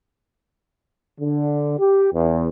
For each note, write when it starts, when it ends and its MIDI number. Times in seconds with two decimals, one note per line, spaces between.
1.19 1.78 50
1.78 2.08 67
2.13 2.48 40